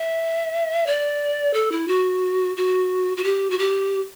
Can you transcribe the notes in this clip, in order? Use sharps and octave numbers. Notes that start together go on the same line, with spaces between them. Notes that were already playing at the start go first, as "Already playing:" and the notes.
Already playing: E5
D5
A4
E4
F#4
F#4
F#4
G4
F#4
G4